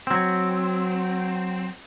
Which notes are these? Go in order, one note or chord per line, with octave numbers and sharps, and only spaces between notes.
F#3 C4